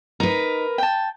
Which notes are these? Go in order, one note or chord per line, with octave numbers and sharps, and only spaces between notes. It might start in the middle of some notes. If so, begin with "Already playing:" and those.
D#4 A#4 B4
G5 A5